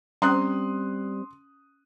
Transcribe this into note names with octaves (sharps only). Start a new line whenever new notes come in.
G3 C4 C#4 C6 D#6 F#6